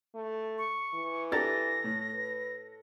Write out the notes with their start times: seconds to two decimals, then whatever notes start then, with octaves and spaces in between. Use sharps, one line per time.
0.15 A3
0.58 C#6
0.95 E3
1.32 D4 G4 A4 A#5 A6 A#6
1.84 A2
2.14 B4